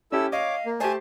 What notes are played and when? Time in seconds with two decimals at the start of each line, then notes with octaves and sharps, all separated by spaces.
0.12 C#4 E4 G4 A4 E6
0.32 C#5 D#5 F5 D6
0.66 A#3
0.80 A3 G4 C5 G#5 A5